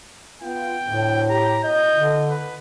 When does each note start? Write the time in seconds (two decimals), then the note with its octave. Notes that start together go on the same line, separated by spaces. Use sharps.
0.42 B3 F4 G5
0.87 D2 A2
1.30 G4 A#5
1.64 B2 E4 D#5 G6
1.95 D3
2.30 B4